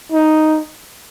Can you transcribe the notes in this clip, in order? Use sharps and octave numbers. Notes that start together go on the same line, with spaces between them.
D#4